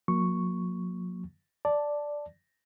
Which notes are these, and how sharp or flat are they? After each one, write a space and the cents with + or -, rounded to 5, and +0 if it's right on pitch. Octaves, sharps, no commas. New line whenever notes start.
F#3 -40 A#3 +0 C#6 +0
D5 +0 A5 +0